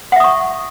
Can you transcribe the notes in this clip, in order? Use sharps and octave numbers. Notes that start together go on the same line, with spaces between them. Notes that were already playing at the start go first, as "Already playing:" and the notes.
E5 F#5 C#6 D#6